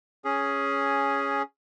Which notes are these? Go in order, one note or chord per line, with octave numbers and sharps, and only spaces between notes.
C#4 G#4